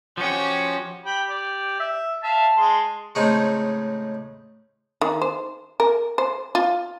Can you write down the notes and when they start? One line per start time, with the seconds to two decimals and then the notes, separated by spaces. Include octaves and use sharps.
0.17 F3 C#4 F#4 G4
1.05 G4 G5 B5
1.29 D5
1.80 E5
2.23 E5 F5 A5
2.57 G#3 C6
3.15 A2 C#3 G#3 A3 C4 D#4
5.01 D#3
5.22 C5
5.80 A#4
6.18 C5
6.55 F4